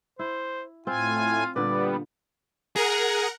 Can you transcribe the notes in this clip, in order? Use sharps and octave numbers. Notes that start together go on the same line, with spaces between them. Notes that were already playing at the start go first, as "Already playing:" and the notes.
E4 C5
A2 C4 F4 G#5
A#2 D3 G3 B3 B4 D5
G#4 A#4 F#5 A#5